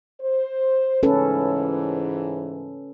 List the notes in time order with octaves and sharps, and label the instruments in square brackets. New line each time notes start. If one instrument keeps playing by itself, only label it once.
[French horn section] C5
[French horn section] G#2 E3 [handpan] C#4 A4 B4